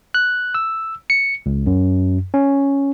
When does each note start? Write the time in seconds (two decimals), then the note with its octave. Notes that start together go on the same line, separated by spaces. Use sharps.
0.14 F#6
0.55 E6
1.10 C#7
1.46 C#2
1.67 F#2
2.34 C#4